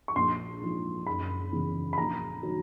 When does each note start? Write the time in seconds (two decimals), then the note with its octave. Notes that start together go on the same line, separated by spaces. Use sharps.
0.08 C#6
0.16 A#1 C6
0.61 G#2 F3
1.07 F#1 B5
1.52 E2 C#3
1.93 B5
1.98 A#1 A#5
2.43 D#3 F#3